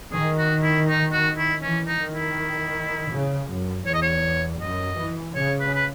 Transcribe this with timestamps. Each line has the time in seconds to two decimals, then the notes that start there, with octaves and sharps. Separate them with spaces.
0.12 D#3 G#4
0.38 F#4
0.63 E4
0.87 D#4
1.12 F#4
1.38 E4
1.62 E3 C#4
1.87 D#4
2.00 D#3
2.12 E4
3.11 C#3
3.49 F#2
3.86 E2 C#5
3.94 D#5
4.02 C#5
4.60 F#2 D#5
4.98 E3
5.35 C#3 C#5
5.60 B4
5.74 B4